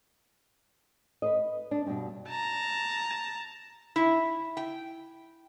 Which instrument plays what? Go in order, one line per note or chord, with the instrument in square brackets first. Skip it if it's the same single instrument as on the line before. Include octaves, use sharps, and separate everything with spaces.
[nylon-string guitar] B4 C5 D#5
D4
G2 B2
[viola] A5 A#5
[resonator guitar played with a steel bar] E4
G5